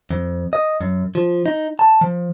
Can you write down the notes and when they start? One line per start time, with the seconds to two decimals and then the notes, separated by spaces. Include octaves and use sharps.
0.11 F2
0.53 D#5
0.81 F#2
1.15 F3
1.46 D#4
1.79 A5
2.01 F3